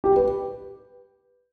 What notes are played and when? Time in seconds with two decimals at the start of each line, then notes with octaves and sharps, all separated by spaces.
0.04 G4
0.16 B4